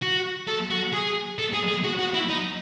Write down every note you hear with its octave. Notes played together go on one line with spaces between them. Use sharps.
F#4
A4
F#4
G#4
A4
G#4
G#4
F#4
F#4
E4
D#4